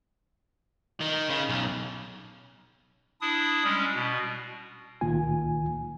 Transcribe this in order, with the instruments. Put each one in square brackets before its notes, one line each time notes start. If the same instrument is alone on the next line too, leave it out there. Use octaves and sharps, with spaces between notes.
[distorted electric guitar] D#3
C#3
B1
[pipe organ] D4 E4 D#6
G3 G#3 C#4
B2
[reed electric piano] C#2 A#2 D#3 A#3 F4 G#5